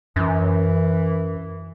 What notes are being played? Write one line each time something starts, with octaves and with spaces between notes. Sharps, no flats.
F#2 E3